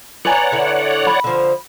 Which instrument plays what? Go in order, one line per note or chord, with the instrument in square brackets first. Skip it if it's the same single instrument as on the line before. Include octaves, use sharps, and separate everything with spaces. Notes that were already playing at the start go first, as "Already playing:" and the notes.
[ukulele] B4 G#5 A#5 [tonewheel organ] C#5 D5 F#5
[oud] D3 E4
[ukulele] B5
[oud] D3 F3